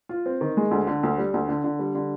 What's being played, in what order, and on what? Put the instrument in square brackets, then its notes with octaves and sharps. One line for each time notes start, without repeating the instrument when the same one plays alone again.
[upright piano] F4
C4
D#3
G#3
D2
D3
D2
G3
D2
D3
D3
G3
D3